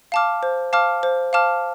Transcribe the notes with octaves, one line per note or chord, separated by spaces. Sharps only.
F5 A5 D6 F6
C5
F5 A5 D6 F6
C5
F5 A5 D6 F6